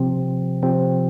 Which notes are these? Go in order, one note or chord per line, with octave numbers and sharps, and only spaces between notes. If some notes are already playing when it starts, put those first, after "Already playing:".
Already playing: C3 F3 C4
C3 F3 C4